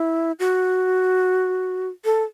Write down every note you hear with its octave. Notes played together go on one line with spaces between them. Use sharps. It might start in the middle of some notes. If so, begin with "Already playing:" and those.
Already playing: E4
F#4
A4